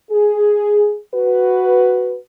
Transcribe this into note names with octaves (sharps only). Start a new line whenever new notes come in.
G#4
F#4 B4